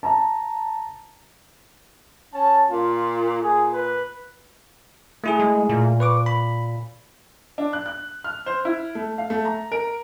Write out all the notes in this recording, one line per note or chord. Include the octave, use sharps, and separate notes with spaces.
A5 A#5
C#4 A5
A#2 F4
A#2 G#4
B4
A3 E4 G#4
G#3
A#2
B4 C#6 D6
B5
D4
F#6
F#6
F6
C5
E4
A3
F5
A3
A#5
A#4